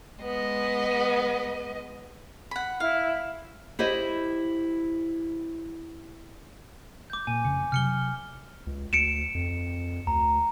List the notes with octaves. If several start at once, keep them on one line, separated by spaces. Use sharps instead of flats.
G#3 B3 D#5
F#5 B5
E4 F5
E4 G4 C5 D#5
D6 G6
A#2 G#5
F1 C#3 C#7
C3 F#3 F6 C#7 G7
C#2
D2 C#7 D7 E7
F2
D2 A#5